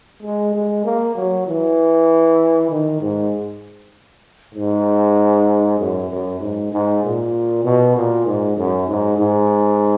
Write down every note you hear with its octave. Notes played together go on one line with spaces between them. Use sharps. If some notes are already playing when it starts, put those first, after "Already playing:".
G#3
G#3
A#3
F#3
E3
D#3
G#2
G#2
F#2
F#2
G#2
G#2
A#2
B2
A#2
G#2
F#2
G#2
G#2